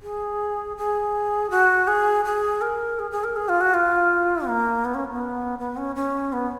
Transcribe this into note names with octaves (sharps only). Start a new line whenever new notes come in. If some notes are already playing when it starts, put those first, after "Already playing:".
G#4
G#4
F#4
G#4
G#4
A#4
G#4
G#4
A#4
G#4
F4
F#4
F4
A#3
B3
C#4
B3
B3
C#4
C#4
B3